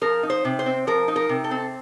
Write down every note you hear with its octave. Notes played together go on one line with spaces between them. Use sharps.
F3 A#4
D#4
C5
C3
C5
C4
F3 A#4
D#4
A#4
C3
A4
C4